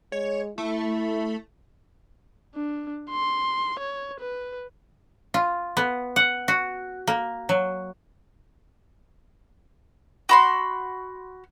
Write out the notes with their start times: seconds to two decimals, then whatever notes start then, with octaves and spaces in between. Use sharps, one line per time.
0.12 G#3 C#5
0.58 A3 E4
2.55 D4
3.10 C6
3.79 C#5
4.20 B4
5.34 F4
5.77 B3
6.16 F#5
6.48 F#4
7.07 A#3
7.49 F#3
10.29 F#4 B5 C6